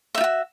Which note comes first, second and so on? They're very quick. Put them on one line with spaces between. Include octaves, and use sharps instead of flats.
E5 D#4 F4 F#4